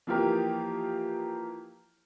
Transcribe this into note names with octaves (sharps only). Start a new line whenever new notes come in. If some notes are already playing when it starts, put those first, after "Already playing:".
E3 F3 A#3 F4 G4 A#4